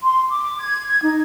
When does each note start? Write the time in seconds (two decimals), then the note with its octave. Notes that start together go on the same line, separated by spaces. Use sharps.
0.03 C6
0.30 D6
0.60 G#6
0.88 G#6
1.03 D#4